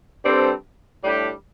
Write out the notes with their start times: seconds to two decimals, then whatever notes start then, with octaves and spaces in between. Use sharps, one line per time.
0.23 G2 G3 C4 A4
1.02 A2 G3 D4 G4